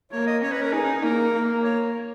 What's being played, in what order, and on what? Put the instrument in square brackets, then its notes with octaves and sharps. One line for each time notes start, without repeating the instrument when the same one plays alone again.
[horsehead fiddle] A#3 [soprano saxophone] C#5
[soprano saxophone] D#5
[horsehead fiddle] C#4 [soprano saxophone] C#5
[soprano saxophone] B4
A#4
[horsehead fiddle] D#4 [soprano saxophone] G#4
[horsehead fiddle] A#3 [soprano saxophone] A#4
[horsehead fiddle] A#3
[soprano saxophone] C#5